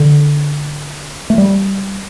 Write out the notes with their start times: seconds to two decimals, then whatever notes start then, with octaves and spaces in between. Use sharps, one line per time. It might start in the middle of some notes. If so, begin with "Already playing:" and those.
Already playing: D3
1.30 A3
1.38 G3